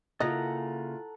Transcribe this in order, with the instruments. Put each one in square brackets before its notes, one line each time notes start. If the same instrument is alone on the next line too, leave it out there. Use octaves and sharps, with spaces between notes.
[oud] C#3 A#3 [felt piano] E4 F4 [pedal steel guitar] A4 F#5 A#5 [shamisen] D#5